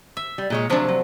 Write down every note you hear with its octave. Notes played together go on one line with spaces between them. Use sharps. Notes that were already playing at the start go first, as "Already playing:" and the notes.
E5
G3
A#2 G#3 C#5
C3 F3 F#3 A3 D4
F#3